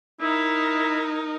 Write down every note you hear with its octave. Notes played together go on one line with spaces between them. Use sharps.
D#4 E4 A#4